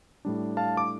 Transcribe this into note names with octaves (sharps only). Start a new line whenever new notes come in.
A2 G3 D4
F5 A5
D6